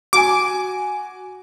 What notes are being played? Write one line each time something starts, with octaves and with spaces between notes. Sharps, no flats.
F#4 G#5 D6